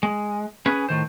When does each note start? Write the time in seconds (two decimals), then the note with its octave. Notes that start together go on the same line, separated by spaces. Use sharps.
0.03 G#3
0.66 C#4 G#4 B4
0.89 A2 D#3 C5